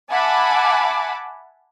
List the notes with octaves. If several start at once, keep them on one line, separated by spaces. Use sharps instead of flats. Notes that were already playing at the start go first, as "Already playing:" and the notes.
E5 F#5 G#5 A5 B5 D6